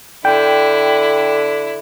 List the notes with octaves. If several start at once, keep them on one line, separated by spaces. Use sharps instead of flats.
D3 E4 G5